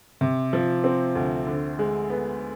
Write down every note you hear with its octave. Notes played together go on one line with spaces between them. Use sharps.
C3
F3
C4
D2
D3
G#3
B3